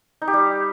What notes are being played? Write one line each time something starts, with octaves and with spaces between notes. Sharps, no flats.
D#4
G4
G3